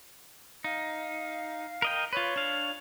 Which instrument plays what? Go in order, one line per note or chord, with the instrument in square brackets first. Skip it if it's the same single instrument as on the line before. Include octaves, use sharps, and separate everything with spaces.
[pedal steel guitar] D#4 [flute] F5
[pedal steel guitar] A#4 D#5 G5
[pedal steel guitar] F4 B4 [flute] C#5
[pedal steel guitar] D4 F5